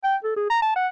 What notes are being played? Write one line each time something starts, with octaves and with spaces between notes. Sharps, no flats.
G5
A4
G#4
A#5
A5
F#5